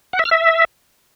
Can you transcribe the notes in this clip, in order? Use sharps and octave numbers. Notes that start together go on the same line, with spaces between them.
F#5
E5
F6
E5